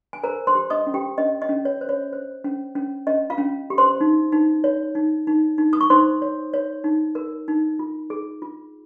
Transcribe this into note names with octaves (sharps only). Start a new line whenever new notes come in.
G#5
A#4 C5 A#5
C5 C6
G4
D#5 D#6
C#4
G4 G5
C#4 D#5
D#5
C#4
C#5
C5
C#5
C5
C#4
C#4
C#4 D#5
F4 F5
C#4
G4
C5 C6
D#4
D#4
C#5
D#4
D#4
D#4
D#6
C#6
D#4 C5 C6
C#5
C#5
D#4
A#4
D#4
F4
G#4
F4